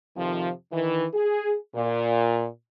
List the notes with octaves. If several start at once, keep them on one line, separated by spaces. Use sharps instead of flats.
F2 C3 D#3 F3
D#3 E3
G#4
A#2